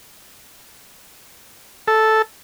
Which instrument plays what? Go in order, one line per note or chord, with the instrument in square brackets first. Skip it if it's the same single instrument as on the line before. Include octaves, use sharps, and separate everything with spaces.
[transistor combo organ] A4